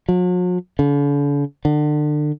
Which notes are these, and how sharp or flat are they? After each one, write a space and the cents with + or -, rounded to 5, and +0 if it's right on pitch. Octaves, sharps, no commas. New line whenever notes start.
F#3 -45
D3 -45
D3 +30